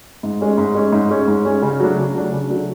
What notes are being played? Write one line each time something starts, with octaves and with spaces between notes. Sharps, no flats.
G#2
G#3 C#4
G#2
G#3 C#4
G#2
G#3 C#4
G#2
G#3 C#4
C#3
F#3 A3 D4
C#3
F#3 A3 D4
C#3
F#3 A3 D4